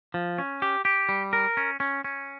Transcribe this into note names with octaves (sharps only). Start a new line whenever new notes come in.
F3
C#4
G4
G4
G3
A#4
C#4
C#4
C#4